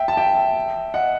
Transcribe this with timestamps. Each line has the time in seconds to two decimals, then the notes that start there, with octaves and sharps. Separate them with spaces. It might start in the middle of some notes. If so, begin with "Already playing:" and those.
Already playing: E5 G5
0.08 A5
0.17 E5 G5
0.94 D#5 F#5